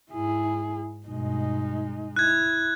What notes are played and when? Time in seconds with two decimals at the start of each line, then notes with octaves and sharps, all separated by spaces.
0.12 G#2 E4 G#4
1.07 G2 B2 G#3 D#4
2.16 E4 F#6 G#6